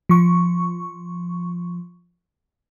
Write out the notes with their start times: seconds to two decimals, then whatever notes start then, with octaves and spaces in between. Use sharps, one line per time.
0.09 F3 C#6